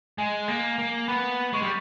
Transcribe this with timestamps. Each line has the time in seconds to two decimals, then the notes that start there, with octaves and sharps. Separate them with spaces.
0.18 G#3 G#5
0.48 A#3
0.79 A#3
1.08 B3 B5
1.53 G#3 C#6
1.62 G3